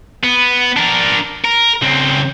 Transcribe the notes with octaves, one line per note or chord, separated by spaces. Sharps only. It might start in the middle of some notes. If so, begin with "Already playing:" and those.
B3
D4 A#4
A#4
C#2 C4